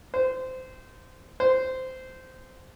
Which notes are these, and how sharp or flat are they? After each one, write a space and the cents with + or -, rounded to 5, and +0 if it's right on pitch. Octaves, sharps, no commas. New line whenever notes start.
C5 -20
C5 -15